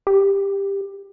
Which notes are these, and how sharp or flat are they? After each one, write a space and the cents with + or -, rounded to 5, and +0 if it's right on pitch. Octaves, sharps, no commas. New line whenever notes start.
G4 +15